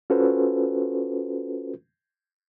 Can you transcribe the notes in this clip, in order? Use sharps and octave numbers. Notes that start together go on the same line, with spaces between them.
C#4 F4 F#4 A4 B4 C5